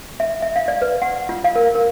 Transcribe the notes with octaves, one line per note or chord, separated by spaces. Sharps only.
E5
E5
F5
D5
B4
F#5
F4
F5
A#4
A#4